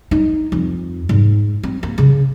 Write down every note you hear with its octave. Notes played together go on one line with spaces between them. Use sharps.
D#4
F2
G#2
C4
A#3
C#3